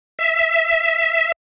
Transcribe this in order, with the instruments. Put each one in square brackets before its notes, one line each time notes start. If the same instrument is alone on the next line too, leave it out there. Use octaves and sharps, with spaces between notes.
[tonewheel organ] E5